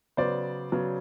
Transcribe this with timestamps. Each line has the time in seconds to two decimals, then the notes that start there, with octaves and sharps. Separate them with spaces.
0.17 C#3 F#3 B3 C5 D5
0.72 C#3 F#3 B3